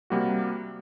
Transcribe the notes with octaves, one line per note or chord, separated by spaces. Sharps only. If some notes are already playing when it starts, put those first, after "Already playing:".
C3 G3 A#3 F#4